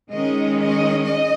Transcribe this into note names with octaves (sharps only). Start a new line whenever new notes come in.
D#3 G#3 C#4 D#5
D#5
D#5